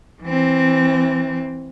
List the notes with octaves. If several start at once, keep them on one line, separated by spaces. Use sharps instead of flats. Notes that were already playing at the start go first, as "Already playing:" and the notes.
E3 C4